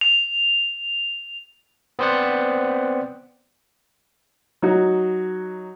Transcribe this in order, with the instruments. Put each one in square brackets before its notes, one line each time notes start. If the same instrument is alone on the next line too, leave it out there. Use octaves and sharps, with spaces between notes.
[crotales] F7
[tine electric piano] B3 C4 C5 D5 F#5
[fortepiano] F#3 D#4 F#4